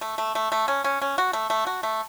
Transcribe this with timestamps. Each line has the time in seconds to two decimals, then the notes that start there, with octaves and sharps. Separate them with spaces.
0.01 A3
0.18 A3
0.35 A3
0.52 A3
0.68 C#4
0.84 C#4
1.02 C#4
1.18 F#4
1.33 A3
1.50 A3
1.67 F#4
1.83 A3